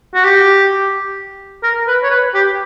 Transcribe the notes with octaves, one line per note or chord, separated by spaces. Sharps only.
F#4
G4
A#4
B4
C#5
B4
G4